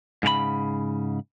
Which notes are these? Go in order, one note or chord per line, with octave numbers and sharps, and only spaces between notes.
G#2 C#3 A#4 B5